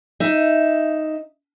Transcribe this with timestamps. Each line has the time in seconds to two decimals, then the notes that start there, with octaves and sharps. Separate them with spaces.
0.20 D#4 E5